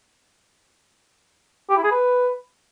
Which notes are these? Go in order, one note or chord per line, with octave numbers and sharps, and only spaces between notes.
G4
E4
G#4
B4